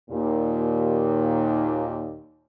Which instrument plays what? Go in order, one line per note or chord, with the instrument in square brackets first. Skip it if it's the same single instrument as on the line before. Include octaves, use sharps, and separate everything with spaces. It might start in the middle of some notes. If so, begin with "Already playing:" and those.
[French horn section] D#2 A#2